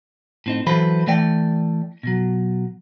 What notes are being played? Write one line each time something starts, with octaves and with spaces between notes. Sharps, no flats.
A2 C4 D#4
E3 F#3 A4 B4 C5 B5
E3 A3 D5 G5
B2 F#3